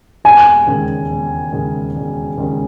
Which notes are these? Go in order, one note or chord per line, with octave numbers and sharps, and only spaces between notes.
E1 G#5
D#2 C#3 G#3 C#4
E1
D#2 C#3 G#3 C#4
E1
D#2 C#3 G#3 C#4